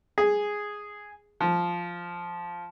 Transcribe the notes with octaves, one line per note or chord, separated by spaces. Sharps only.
G#4
F3